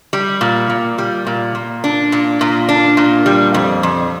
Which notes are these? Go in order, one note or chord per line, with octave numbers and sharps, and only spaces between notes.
G3
A#2
A#2
G3
A#2
A#2
D4
A#2
A#2
D4
A#2
G3
F2
F2